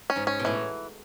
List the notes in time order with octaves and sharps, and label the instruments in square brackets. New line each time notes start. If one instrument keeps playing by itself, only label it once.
[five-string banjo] C#4
[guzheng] G#2
[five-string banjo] C#4
[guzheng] B2
[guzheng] A2 [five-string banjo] E3